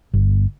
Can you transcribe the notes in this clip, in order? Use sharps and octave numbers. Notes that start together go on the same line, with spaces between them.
G1